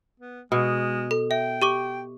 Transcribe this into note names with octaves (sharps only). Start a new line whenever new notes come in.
B3
B2 G#3
A4
E5 G5
G4 C#6 D6